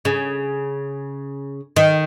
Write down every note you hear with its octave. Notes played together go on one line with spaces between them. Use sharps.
C#3
D#3